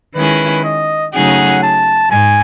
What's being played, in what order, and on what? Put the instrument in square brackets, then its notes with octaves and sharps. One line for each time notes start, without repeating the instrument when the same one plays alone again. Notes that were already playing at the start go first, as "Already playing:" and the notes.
[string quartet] D#3 G#3 C#4 E4 G#4 [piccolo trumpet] B4
[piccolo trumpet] D#5
[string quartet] C#3 F#3 A3 D#4 G#4 [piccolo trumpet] F#5
[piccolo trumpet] A5
[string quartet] G#2 [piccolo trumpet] G#5